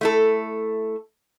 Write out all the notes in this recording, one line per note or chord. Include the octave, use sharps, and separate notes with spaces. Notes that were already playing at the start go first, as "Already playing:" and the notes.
A3 E4 A4